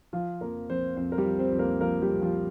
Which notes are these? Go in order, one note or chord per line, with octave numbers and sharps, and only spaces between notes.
F3 F4
F2 A#3 A#4
F3 C4 C5
F2 C4 C5
A#4
G3 G4
F3
C4 C5
F2
A#3 A#4
F3 A#3 A#4
G3 G4
F2
F3 F4